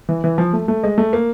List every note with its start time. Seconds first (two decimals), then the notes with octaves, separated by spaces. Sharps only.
0.09 E3
0.24 E3
0.38 F3
0.53 A3
0.68 A3
0.84 G#3
0.98 A3
1.13 A#3